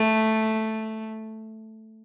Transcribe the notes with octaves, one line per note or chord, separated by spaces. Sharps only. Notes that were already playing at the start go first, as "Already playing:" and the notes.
Already playing: A3